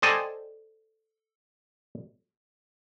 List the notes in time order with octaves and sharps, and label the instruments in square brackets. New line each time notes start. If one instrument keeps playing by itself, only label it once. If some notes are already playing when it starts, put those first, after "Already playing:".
[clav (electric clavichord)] A4 C5 D5 D#5 G5 G#5